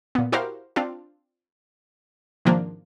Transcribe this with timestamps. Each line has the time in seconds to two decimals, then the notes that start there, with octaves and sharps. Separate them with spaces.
0.15 A#2 B3
0.32 E4 F#4 G4 A#4 C5 F5
0.76 C4 D4 F4
2.45 G#2 C3 D#3 F3 A#3 D4